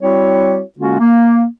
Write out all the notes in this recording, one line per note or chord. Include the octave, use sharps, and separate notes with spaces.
G3 C4 E4 F#4 C#5
D3 G#3 A#3 C#4 F4 F#4
A#3